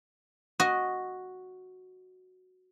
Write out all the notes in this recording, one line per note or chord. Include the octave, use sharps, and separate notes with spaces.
F#4 D#5